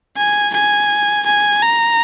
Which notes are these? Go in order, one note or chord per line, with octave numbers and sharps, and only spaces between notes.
G#5
G#5
G#5
A#5